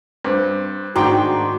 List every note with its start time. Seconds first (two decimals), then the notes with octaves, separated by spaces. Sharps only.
0.24 G2 C4
0.96 G#2 D#3 D4 F#4 G5 A#5 C6 D6